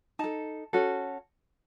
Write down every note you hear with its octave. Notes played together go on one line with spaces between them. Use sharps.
D#4 A4 A5
C#4 F#4 A4